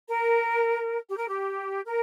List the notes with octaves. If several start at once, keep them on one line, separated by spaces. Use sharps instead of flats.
A#4
G4
A#4
G4
A#4